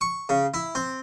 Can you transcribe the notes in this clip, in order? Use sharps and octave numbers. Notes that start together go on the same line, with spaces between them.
C#6
C#3
E4
C4